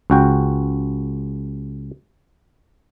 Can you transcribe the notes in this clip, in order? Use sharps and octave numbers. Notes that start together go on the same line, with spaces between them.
C#2 F#4 G5